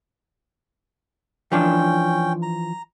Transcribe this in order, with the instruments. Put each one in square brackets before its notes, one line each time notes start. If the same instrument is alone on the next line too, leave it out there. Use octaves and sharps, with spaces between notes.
[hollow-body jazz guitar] E3 F3 D4 [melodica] C#4 G5
[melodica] A#5